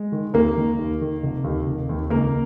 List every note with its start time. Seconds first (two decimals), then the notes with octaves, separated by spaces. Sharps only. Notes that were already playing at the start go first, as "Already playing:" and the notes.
Already playing: G#3
0.12 D#3
0.34 D#2 A#3 A#4
0.57 D#3
0.79 D#2
1.01 D#3
1.23 F1
1.44 D#2 D#3
1.67 F1
1.89 D#2 D#3
2.10 C#2 A#3 A#4